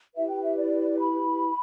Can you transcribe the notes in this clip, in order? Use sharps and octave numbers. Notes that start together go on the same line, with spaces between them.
E4 G4 B4 E5
G5
E5
D5
B5